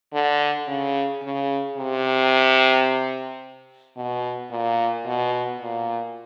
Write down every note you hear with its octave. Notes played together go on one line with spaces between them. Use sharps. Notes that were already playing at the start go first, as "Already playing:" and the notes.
D3
C#3
C#3
C3
B2
A#2
B2
A#2